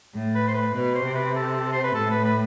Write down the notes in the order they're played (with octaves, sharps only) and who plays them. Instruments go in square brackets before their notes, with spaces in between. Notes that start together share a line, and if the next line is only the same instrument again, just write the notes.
[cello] A2
[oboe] B4
C5
B4
[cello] B2 [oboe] B4
[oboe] C5
[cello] C3
[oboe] B4
A4
C5
B4
[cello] A2 [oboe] A4
[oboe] B4
B4